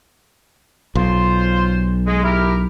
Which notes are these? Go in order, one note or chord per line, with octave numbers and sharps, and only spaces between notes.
B1 F4 C5
G#3
E4 G4 A#4